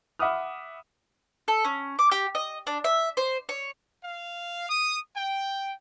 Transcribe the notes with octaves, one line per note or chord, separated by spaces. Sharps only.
E5 F#5 B5 D6 D#6 F6
A4
C#4
D6
G4
D#5
D4
E5
C5
C#5
F5
D#6
G5